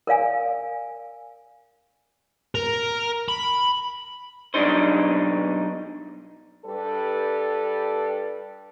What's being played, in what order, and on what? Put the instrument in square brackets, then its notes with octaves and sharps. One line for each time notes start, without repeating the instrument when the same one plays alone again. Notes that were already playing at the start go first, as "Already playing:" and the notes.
[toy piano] A#4 D5 F5 G#5
[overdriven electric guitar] A#4
B5
[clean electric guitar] B1 F2 G3 D4 D#4 C5
[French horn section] G2 G3 A4 B4 D5